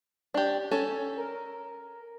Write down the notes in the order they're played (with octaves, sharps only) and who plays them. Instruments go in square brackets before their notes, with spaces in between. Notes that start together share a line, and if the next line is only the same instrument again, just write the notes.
[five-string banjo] D4 G4
C#4 A4
[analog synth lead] A#4